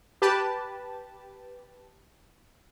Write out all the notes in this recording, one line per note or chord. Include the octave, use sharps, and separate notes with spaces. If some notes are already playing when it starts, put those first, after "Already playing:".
G4 B4 A5